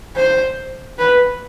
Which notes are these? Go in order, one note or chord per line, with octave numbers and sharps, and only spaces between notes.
C5
B4